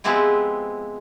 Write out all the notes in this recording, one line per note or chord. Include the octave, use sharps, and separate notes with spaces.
F3 G#3 B3 C4 E4 G4